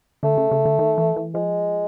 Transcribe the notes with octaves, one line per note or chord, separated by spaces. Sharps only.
D3 A3
C#3
C#3
D3
D#3
E3
E3
F3 G#3